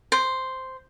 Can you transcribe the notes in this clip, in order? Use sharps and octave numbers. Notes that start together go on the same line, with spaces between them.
C5